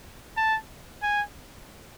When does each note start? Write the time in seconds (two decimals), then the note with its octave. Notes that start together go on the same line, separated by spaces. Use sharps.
0.37 A5
1.03 G#5